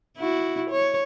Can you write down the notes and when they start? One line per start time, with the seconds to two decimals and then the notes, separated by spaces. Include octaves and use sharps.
0.18 E4 F#4
0.70 C#5